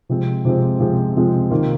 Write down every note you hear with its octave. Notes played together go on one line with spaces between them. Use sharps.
C3 F3 G#3 C4
C3 F3 G#3 C4
C3 F3 G#3 C4
C3 F3 G#3 C4
C3 D#3 A#3 F4